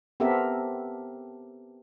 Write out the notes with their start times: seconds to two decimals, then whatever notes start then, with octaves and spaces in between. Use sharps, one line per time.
0.20 B3 C4 G4 A4 A#4 E5